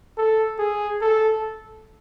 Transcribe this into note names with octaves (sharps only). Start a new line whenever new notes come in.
A4
G#4
A4